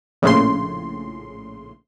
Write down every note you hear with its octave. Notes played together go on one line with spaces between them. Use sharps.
A#1 A2 C#3 C6